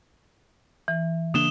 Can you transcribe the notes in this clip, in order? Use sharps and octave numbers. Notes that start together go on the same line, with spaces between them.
E3
C#3 A#3 D4 D#6 E7 G7